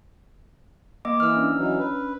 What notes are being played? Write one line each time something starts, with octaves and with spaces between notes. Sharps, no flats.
A#3 D#5 D6
E3 D6 E6 F6
C#4 D4
E3 F#3 D#4
B4